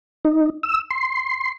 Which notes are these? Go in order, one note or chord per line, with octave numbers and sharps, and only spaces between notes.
D#4
E6
C6